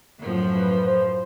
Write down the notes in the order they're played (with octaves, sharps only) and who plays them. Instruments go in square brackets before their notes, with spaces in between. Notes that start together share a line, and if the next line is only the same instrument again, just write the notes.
[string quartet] F#2 A2 F3
[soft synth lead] B4
C5